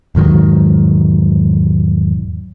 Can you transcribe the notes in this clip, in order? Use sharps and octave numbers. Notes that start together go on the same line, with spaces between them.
E1 G#2 D#3 F#3